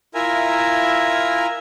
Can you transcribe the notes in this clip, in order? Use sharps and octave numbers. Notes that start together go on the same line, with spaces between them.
E4 F4 A#4 E5 G#5 A#5